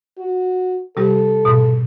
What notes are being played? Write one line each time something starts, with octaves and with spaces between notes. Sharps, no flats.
F#4
C3 G3 G4 A4
G#2 B2